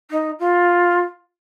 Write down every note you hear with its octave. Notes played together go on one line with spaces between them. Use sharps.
D#4
F4